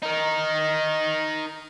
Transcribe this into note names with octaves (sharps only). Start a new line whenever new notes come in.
D#4 A#4